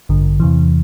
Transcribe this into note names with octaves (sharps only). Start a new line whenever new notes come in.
A1 G2 D3
E2 C3 E3